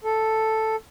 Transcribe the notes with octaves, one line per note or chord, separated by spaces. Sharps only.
A4